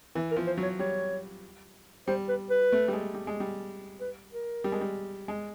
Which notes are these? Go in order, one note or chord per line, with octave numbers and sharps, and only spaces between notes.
E3
A#4
F3
C5
F#3
C#5
G3 C#5
G3 C5
B4
B4
A3
G3
G#3
G3
G#3
G3
B4
A#4
G3
G#3
G3
G#3